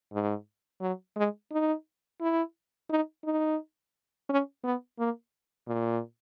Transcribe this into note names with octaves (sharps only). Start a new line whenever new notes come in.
G#2
F#3
G#3
D#4
E4
D#4
D#4
C#4
B3
A#3
A#2